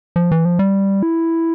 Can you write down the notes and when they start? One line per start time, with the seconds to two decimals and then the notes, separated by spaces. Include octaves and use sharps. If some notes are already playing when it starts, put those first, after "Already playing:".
0.16 F3
0.32 E3
0.45 F3
0.59 G3
1.03 E4